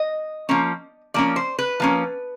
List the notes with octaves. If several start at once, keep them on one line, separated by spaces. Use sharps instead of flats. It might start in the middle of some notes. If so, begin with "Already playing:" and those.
Already playing: D#5
F3 A#3 C#4
F3 A#3 C#4 D5
C5
B4
F3 A#3 C#4